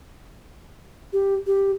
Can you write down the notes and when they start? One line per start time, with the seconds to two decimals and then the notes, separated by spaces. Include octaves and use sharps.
1.13 G4
1.47 G4